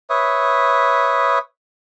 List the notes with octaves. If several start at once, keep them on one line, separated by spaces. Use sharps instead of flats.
B4 C#5 E5 D#6